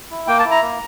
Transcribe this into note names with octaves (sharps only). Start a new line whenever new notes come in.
E4
A#3 G5
A5
E4
A#5
A#3